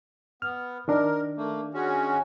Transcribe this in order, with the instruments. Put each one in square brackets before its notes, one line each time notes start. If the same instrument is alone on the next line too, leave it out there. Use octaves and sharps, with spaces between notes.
[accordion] B3 [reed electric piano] F6
[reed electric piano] D#3 D4 [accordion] A#4
[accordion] A3 A#3
G#3 C#4 F#4